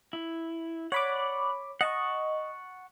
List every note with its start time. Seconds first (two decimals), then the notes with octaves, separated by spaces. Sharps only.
0.13 E4
0.92 C#5 D5 F#5 B5 D6
1.81 D#5 F#5 A5 C#6